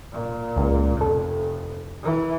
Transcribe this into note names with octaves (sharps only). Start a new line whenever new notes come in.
A#2
C#2
F1 A4
E3